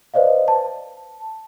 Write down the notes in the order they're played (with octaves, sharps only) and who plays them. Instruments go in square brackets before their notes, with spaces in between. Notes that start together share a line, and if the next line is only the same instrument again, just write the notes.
[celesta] B4 C5 D5 D#5 F5
A5